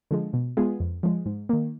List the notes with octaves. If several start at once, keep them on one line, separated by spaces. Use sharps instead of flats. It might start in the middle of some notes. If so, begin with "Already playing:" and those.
D3 F3 G#3
B2
G#3 B3 F4 G#4
F2
F3 G#3
G#2
D#3 A#3